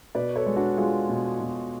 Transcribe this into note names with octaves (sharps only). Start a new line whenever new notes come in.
B2 B4 D5
A4 C#5
G#3
D4 F#4
G#3 F4 G#4
B2
B2